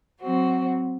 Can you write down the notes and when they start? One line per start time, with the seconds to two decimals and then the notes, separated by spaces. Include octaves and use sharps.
0.20 F#3 C4 F#4 C5